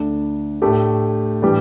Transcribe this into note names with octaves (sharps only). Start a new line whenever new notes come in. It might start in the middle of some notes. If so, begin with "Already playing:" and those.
Already playing: D2 D3 A3 D4
A2 A3 D4 G4
A2 E3 G3 D4 G4